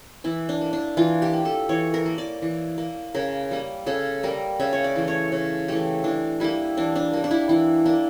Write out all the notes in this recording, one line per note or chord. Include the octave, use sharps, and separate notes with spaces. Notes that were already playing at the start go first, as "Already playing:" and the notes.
E3 E4
D4
A#3
D4
E3 F4
G4
A#3
A4
E3 C#5
A#4
A#3
D5
E3
A#3
C#3 A#4
G3 A#3
C#3 A4
G3 A#3 A#4
C#3 E5
C#5
D5
E3 A3
C#5
C#3
E3 A3 G4
E3 D4
G3 A#3 E4
E3 D4
D4
G3 A#3
D4
E4
E3 E4
A#3 D4